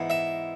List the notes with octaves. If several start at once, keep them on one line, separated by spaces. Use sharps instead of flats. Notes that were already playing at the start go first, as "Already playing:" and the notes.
Already playing: G#2 E3 G#3 B3
E5